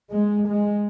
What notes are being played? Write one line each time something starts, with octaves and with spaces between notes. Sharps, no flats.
G#3
G#3